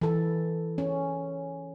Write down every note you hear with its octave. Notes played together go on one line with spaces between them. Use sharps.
E3 A4
C#4